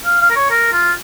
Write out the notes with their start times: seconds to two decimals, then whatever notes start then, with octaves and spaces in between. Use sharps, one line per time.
0.05 F5
0.21 F5
0.30 A#4
0.36 C#5
0.51 A#4
0.73 F4